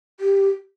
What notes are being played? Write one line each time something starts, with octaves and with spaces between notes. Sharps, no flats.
G4